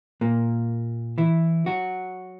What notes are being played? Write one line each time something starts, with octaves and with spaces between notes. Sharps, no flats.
A#2 A#3
E3 E4
F#3 F#4